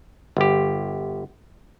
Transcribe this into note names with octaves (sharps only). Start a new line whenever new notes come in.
G1 G4